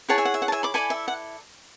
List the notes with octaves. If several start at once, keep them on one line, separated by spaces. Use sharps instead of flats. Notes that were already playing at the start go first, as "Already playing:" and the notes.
E4 G#4 C#5 F#5 A5
E5 G#5
F#5
E5
F#5
A5
E5 G#5
B5 D6
E4 A4 D5 G#5 B5
E5
F#5